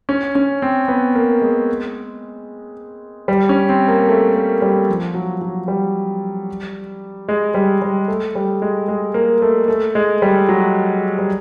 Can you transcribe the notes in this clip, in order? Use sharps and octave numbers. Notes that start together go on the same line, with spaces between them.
C#4
C#4
C4
B3
A#3
G#3
G3
C#4
C4
A#3
A3
A#3
G3
F3
F#3
F#3
G3
G#3
G3
G3
A3
G3
G#3
G#3
A#3
A3
A3
G#3
G3
F#3
G3